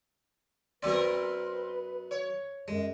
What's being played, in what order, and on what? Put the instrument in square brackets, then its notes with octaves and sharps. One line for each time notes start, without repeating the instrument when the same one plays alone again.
[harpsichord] F#2 B3 D5 [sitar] C4 A#4 [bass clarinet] B4
[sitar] C#5
[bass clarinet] F#2 [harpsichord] G#3